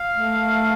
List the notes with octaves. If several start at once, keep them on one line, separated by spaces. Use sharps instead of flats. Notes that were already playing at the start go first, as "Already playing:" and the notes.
Already playing: F5
A3